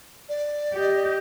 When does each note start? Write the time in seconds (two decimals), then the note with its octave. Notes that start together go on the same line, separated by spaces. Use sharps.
0.29 D5
0.74 G4 D#5